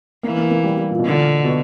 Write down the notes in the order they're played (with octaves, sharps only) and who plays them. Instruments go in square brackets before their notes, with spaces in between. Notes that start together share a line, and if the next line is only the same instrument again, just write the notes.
[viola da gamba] E3 [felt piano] A#3
[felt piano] A#3
A#3
G3
G3
A#2
B2
[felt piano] A#2 [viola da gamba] D3
[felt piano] B2